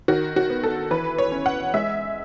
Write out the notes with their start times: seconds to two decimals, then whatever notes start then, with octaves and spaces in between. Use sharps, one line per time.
0.08 D#3 F#4
0.36 F#4
0.50 B3
0.63 A4
0.91 E3 B4
1.18 C#5
1.32 C#4
1.46 F#5
1.74 G#3 E5